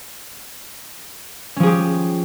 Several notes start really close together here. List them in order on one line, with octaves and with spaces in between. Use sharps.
C#4 F3 G#4 G4